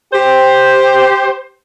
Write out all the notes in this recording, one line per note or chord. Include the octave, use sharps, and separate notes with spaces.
G4 C5